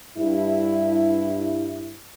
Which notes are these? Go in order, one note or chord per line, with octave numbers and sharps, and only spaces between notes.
G2 E4